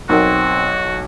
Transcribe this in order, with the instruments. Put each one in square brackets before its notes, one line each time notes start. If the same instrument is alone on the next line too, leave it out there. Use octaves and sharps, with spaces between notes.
[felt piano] B1 [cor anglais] C4 [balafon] D#4 A#4 F#5 [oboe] F#4